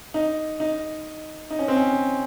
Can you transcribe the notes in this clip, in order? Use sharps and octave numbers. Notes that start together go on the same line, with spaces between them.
D#4
D#4
D#4
C#4
C4
C#4